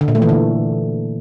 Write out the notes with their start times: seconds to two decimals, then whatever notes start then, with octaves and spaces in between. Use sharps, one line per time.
0.01 D3
0.08 A#2
0.15 A3
0.22 E3
0.29 D3